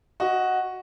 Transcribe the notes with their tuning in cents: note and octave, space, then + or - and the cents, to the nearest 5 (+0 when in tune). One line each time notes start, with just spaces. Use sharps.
F#4 +0 D#5 +10